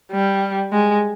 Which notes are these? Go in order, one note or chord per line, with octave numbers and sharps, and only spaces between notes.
G3
G#3